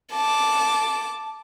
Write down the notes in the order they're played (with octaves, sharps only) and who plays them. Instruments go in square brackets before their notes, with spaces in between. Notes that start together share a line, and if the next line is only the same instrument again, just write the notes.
[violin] A5 D6